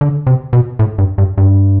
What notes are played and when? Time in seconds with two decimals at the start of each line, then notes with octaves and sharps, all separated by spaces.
0.01 D3
0.27 C3
0.53 B2
0.79 A2
0.98 G2
1.18 G2
1.38 G2